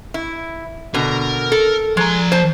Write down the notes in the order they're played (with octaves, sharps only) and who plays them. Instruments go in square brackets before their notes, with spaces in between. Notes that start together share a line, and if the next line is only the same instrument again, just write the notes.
[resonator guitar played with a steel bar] E4
[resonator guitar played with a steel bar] B2 D3 [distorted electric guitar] A#4
[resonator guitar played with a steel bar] A4
[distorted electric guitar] F3 A#5 [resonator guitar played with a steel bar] G#3
[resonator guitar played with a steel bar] C5 A5